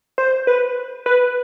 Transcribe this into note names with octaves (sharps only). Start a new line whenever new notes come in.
C5
B4
B4